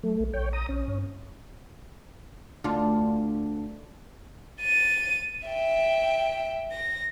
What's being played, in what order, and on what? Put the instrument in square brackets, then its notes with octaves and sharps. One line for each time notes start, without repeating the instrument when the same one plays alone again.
[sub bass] F#3 [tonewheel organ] A3
[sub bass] A#1
[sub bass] A#1 [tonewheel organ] C#5 G5
[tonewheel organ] A#5 D#6
[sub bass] A#1 [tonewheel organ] C#4
[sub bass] G2
[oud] D2 D4 F4
[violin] A6 D#7
E5 G5
A#6